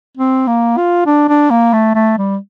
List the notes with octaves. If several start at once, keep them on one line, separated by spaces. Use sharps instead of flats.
C4
A#3
F4
D4
D4
A#3
A3
A3
G3